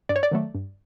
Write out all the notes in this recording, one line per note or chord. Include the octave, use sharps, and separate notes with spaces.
G2 D5
C#5
D5
D#3 F#3 A3
G2